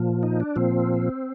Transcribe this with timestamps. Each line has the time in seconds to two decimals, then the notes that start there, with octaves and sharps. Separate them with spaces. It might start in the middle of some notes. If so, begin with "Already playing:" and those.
Already playing: A#2 F3
0.23 D#4
0.40 D4
0.56 A#2 F3 C4